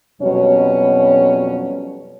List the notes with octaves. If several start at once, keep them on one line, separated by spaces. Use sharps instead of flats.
F2 B2 F#3 G3 C#4